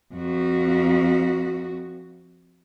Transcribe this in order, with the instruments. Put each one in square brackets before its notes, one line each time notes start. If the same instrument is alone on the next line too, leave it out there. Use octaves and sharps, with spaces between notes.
[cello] F2 F#4